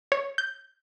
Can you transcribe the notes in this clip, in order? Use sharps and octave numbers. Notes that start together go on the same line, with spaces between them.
C#5
G6